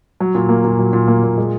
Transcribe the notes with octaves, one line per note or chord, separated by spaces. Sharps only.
F#3
A#2
A#3
A#2
F#3
A#2
A#3
A#2
G#3